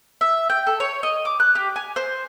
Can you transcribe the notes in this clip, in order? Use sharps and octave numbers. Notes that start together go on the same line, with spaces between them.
E5
G5
A4
C#5
D#5
D6
F#6
G4
G#5
C5